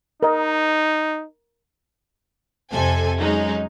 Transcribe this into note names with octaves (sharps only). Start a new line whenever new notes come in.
D#4 A#4 D#5
F2 C3 A4 G#5
F#3 G#3 C#4 D#4